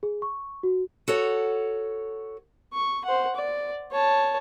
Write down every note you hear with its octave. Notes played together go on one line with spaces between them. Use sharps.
G#4
C#6
F#4
F#4 A4 C#5 F#5
C#6
C5 F#5
D5
C#5 A5